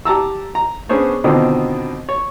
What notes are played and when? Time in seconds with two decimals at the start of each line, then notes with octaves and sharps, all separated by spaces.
0.05 G4 A5 A#5 E6
0.55 A#5
0.89 B3 C#4 D4 G#4 C5 C#5
1.24 B2 D3 D#3 C4 F4
2.09 C#5